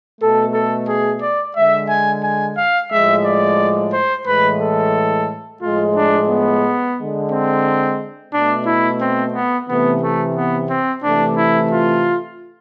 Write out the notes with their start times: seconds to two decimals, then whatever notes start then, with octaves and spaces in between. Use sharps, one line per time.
0.21 B2 A3 A4
0.54 A4
0.89 G#4
1.22 D5
1.56 D3 G#3 E5
1.89 G#5
2.24 G#5
2.58 F5
2.91 A2 F3 G#3 E5
3.25 D5
3.93 C5
4.26 A2 E3 G#3 B4
4.60 A4
5.62 A2 F3 G#3 F4
5.96 D4
6.29 B3
6.97 D3 G#3
7.32 C4
8.33 B2 A3 D4
8.67 E4
9.01 C4
9.35 B3
9.69 C3 E3 A3 B3
10.02 A3
10.36 B3
10.70 C4
11.03 C3 E3 A3 D4
11.37 E4
11.72 F4